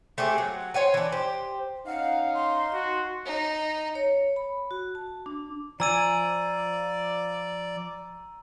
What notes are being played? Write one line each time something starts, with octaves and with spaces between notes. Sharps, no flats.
A3 C4 G4 G#4
F#3
C5 C#5 F#5 G#5
E3 D4
G4 C5
C#4 D#4 F5 F#5
C6
F#4
D#4
C#5
B5
F#4
A5
D4
F3 D5 G#5 A#5 E6 D#7